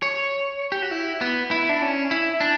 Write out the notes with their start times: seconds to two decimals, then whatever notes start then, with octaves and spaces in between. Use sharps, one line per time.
0.02 C#5
0.72 G4
0.82 F#4
0.91 E4
1.21 B3
1.51 E4
1.69 D4
1.82 C#4
2.11 E4
2.41 D4